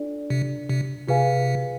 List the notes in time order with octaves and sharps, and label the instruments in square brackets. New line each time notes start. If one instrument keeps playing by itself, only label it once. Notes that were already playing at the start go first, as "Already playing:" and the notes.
Already playing: [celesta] D4 F4 A4 D5
[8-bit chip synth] C3
C3
[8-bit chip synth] C3 [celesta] F4 G#4 B4 F5 G#5